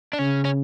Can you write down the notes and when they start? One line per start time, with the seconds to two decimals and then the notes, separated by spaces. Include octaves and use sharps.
0.13 D4
0.19 C#3 C#4
0.45 C#4